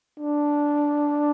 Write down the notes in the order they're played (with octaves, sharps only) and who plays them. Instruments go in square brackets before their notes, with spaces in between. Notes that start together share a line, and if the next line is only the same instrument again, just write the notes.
[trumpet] D4